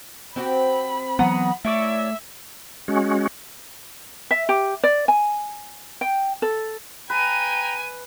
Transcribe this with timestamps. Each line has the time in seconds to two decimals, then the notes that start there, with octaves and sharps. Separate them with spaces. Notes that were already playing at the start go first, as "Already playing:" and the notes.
0.36 C4 F#4 G4 B5
1.19 E3 F#3 B3 F#5 A#5 D#6
1.65 A3 E4 C#5 D5 E5
2.88 G#3 C#4 F#4
4.31 E5
4.49 G4
4.83 D5
5.08 G#5
6.01 G5
6.42 A4
7.10 B4 G5 G#5 A#5 D#7